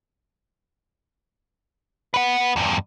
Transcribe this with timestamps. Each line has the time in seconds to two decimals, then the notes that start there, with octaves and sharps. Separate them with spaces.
2.14 B4 F#5
2.56 E2 G2